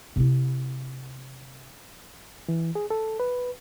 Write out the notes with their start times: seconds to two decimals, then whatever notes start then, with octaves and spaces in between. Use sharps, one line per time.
0.16 C3 E4
2.48 E3
2.75 G#4
2.90 A4
3.20 B4